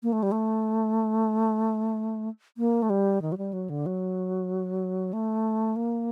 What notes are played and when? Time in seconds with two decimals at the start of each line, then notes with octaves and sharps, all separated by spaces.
0.03 A#3
0.13 A3
0.23 G3
0.32 A3
2.58 A#3
2.82 A3
2.90 G3
3.22 D#3
3.32 F#3
3.38 G3
3.53 F#3
3.70 D3
3.86 F#3
5.13 A3
5.76 A#3